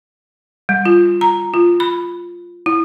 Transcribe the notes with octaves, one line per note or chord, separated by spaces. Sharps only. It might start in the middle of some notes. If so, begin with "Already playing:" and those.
G3
F4
A#5
F4
B5
E4